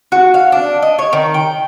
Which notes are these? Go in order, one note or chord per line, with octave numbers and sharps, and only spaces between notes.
F#4
F5
D4
D#5
C#5
D#3
G5